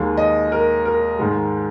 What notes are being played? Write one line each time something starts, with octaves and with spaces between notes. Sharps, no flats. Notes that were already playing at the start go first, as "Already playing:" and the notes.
Already playing: D#2 D#3 G#3
D#5
A#4
A#4
G#2 D#3 G#3